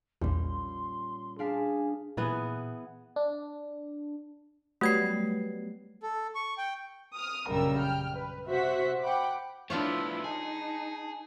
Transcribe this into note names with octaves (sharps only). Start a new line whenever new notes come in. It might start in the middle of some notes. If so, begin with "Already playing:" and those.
A#1 E2 A#2 G3 C#4 C6
D4 G#4 F5 A5 B6
A#2 E3 B3 G#4
D4
F#3 G3 A3 B3 G#6 C7
A4
C#6
G5
D#6 F6
A#1 F#2 C#3 G3 A#4 E6
G5 F6
B4
C3 F#4 C5 E5 F#5 B6
F#5 G5 B5 D6
F3 A3 B3 D4 E4 F4 C#5
D#4 G#4 A5